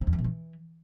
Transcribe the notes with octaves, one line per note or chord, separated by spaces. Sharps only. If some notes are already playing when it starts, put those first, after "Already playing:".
C3
E2
E3
B2
E3